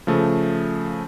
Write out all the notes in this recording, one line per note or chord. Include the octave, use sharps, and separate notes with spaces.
C#3 F3 A3